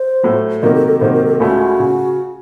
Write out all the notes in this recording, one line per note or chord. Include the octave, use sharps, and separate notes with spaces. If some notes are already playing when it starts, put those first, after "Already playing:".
Already playing: C5
A2 F#3 A3
C3 D#3 F#3 A#3 A#4
A4
A4
C3 D#3 F#3 A#3 C5
A#4
A4
C#2 C#3 A3 C#4 F#4
C#3